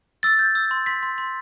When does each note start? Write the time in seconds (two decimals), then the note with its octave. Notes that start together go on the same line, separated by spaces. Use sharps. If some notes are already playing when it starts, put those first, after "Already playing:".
0.23 E6 A6
0.39 G6
0.55 E6
0.71 C6
0.86 C6 B6
1.03 C6
1.18 C6